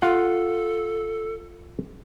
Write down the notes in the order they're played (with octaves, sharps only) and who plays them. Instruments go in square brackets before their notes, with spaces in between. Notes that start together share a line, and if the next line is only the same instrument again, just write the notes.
[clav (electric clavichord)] F4 F5 F#5 [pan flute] A4